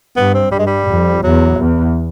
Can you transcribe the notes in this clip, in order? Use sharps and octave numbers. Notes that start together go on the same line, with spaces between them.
G2 B3
C4
G2 G3
G#3
G3
F2
E2 F#3
E2